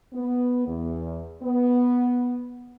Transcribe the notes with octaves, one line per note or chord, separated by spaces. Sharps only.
B3
E2
B3